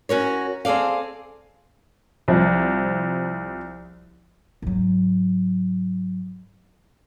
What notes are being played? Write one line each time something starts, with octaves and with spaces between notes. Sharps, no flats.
C#4 F#4 A#4 C#5
C4 G#4 A4 D5 F5
C2 F3
G#2 F#3